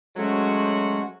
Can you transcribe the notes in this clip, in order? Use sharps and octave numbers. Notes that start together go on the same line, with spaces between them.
F#3 G#3 A3 C#4 F#4 C5